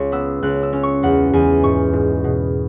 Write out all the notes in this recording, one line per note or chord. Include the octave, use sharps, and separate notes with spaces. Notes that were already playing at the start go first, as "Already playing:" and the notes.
Already playing: C#2 C#6
B3 E6
C#2 F#6
E6
C#4
C#6
E2 F#5
E2 G#5
G#2 C#6
G#2
B2